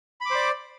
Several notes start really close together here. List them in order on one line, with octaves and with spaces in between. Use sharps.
B5 D6 C5 D5